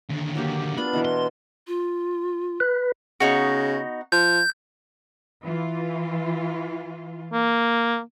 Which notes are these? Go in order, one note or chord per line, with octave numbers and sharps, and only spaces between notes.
D#2 D3
F#3 A#3 G4
B3 D4 F4 B5
B2 E3 A#4
C6
F4
B4
C#3 B3 D#4 F#4
F3 G6
E3 F4
A#3